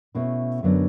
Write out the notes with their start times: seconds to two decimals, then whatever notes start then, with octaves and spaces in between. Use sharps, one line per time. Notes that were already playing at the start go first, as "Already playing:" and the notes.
0.15 B2 A3 C#4 E4
0.63 F#2 D3 F#3 B3 D4